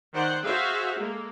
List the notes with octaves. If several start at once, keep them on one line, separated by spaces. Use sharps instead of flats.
D#3 C5 D5 F#5 C6
F#4 G#4 C5 E5 F5
G#3 A#3 A4